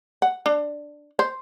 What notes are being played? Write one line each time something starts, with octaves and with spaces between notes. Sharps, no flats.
F#5
D4
C5